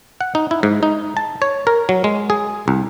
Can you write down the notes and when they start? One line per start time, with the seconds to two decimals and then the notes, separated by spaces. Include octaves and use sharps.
0.21 F#5
0.35 D#4
0.51 E4
0.63 G#2
0.83 D#4
1.17 A5
1.42 C#5
1.67 A#4
1.89 F#3
2.04 G#3
2.30 G#4
2.68 C2